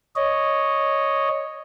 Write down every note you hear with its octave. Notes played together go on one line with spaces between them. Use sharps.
C#5 D#5